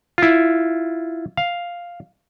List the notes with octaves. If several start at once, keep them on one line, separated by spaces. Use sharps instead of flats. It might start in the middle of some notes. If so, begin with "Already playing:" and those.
E4 F4
F5